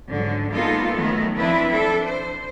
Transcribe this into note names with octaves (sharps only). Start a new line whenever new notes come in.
G#2 D3 F#3
G#3 A#3 B3 D#4 F4 A4
D#3 F#3 A3 B3
F3 C4 D4 E4 B4
D4 A4
C5